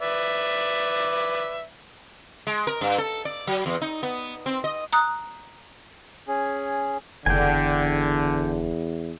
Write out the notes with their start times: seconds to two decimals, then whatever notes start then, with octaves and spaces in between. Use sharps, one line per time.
0.01 B4 D5 E5
2.47 G#3
2.67 A#4
2.81 G2
2.98 A4
3.25 D5
3.47 F#3
3.66 E2
3.82 D#4
4.03 B3
4.46 C4
4.64 D#5
4.93 A#5 D#6 F#6
6.28 C#4 G#4
7.26 F#1 E2 D3 G5 G#5